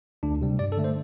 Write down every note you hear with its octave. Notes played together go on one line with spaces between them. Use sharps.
D2 D4
C3 G3
G2 D5
A4
D3 A3
C5